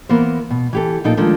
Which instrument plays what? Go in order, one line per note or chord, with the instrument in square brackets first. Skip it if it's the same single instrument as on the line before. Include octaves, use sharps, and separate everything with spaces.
[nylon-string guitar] E3 A#3 B3 A#4 C5
B2
E3 G4 A4
A#2 F3 D#4 A4 G5
D#3 F3 G#3 A3 D4 A4